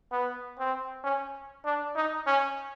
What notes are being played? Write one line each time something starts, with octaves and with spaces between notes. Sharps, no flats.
B3
C4
C#4
D4
D#4
C#4